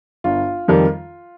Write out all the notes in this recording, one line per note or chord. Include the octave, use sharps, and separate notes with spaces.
G1 F4
F2 D#3 G3